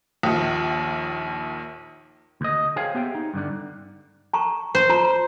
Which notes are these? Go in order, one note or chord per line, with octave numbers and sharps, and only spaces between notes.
A#1 D#2
D2 D#5
G#4 C5 C#5 F5 G5 G#5
B3 G4 E5 G5
D#4
G2 D3 D4
A5 A#5 C#6
C5
F4 A5 A#5